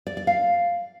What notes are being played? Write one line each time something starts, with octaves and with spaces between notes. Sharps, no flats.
D5
D5
F5